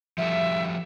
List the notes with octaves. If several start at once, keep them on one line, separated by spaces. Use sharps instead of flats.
F3 G3 A4 E5